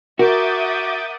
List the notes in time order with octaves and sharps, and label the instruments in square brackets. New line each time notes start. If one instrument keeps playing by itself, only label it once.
[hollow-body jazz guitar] F#4 [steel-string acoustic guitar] A#4 [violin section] E5 F#5 D#6 [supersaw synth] D6 G6 A6